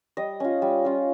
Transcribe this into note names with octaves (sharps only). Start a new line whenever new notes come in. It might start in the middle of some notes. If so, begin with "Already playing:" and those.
G3 D#5
C#4 F4
G3
C#4 F4